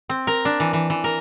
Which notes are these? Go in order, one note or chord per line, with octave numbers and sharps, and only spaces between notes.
C4
A#4
D4
E3
E3
E3
A#4